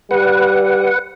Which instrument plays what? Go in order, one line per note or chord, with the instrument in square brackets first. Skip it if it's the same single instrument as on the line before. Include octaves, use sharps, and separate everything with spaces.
[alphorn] G3 [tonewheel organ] B4 F#5